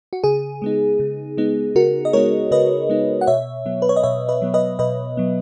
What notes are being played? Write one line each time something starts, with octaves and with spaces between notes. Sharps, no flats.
F#4
C#3 G#4
G#3 B3 D#4
C#3
G#3 B3 D#4
C#3 F#4 A#4
D#5
G#3 B3 D#4 A#4 C#5
C#3 B4 D#5
G#3 B3 D#4
F#5
B2 C#5 E5
F#3 B3
B4
C#5
D#5
B2 C#5 E5
B4 D#5
F#3 B3
B4 D#5
B2 B4 D#5
F#3 B3